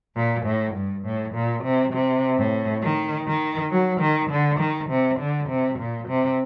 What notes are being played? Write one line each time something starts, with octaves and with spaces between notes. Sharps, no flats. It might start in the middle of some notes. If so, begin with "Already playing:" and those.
A#2
A2
G2
A2
A#2
C3
C3
A2
D#3
D#3
F#3
D#3
D3
D#3
C3
D3
C3
A#2
C3